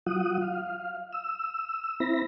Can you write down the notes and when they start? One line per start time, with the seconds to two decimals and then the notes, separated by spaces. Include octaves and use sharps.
0.06 F#3 F4 F#5 D#6
0.42 F5
1.13 E6
2.00 C4 E4 B5 A#6